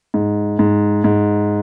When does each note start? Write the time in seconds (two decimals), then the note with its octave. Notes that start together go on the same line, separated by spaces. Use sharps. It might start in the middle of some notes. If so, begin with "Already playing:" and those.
0.14 G#2
0.59 G#2
1.04 G#2